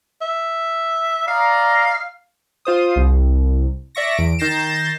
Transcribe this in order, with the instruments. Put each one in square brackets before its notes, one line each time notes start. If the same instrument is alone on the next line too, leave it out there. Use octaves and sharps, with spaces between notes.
[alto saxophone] E5
[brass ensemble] D5 D#5 A#5 [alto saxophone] F5
[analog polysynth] F4 C5 D#6
C2
D5 E5 C#6 A#6
E2 D7
D#3 G6 A6 A#6 C7 E7